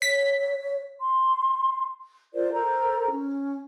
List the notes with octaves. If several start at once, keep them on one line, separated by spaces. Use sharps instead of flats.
C#5 B6
C6
F4 A#4 C5 D5
A4 A#4 C5 A#5
C#4